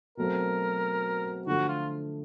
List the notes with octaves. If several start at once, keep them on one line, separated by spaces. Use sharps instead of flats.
B2 F#3 A3 C4 A#4
D3 F3 A3 F#4
F4